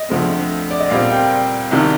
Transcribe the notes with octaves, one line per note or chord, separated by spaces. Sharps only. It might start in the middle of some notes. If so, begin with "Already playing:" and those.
Already playing: D#5
D2 D3 F3 A3 C4
D5
D#5
A#2 G3 C4 F5
G5
C2 C3 D#3